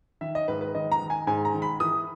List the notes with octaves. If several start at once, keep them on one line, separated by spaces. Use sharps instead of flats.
D#3 E5
D#5
G#2 B4
B4
D#3 D#5
A#5
D#3
G#5
G#2 G#5
A#5
D#3
B5
E3 D#6